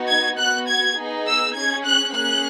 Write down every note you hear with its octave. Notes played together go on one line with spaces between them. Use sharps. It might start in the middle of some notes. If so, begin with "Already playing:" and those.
Already playing: B3 D#4 F#4
G#6
B3 F#4 F#6
G#6
B3 D#4 G#4
E6
C#4 G#4 G#6
F#6
A#3 C#4 G#4 F#6